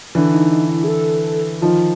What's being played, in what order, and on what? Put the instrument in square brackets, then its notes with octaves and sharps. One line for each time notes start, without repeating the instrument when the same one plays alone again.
[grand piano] D3 E3 [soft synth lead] D4
[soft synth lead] D#4
D#4
E4
G#4
A4
[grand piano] D#3 F3 [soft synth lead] F4